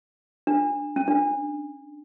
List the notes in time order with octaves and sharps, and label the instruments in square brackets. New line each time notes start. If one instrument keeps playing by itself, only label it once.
[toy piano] D4
C#4
D4